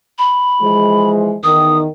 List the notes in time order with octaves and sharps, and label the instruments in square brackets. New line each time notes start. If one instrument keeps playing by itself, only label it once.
[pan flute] B5
[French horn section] E3 F3 G#3
[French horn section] E2 D#3 [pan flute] D#6